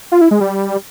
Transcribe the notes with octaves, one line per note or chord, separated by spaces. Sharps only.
F4
E4
G#3
G3